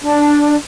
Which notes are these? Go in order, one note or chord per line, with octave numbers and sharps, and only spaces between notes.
D4